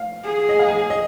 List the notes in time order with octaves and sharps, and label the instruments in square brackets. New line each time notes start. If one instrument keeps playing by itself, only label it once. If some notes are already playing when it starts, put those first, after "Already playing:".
Already playing: [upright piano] F5
[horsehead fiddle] G#4
[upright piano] D#5
F5
G#5
D#5